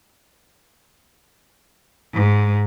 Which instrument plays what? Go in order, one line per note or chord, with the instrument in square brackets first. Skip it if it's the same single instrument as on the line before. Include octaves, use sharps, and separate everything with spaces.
[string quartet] G#2